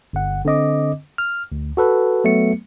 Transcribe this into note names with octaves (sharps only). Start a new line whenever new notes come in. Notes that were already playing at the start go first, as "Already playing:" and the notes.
G1 F#5
D3 C4 D#5 D6
F6
D2
F#4 A4 B4
F#3 A3 B3 C#7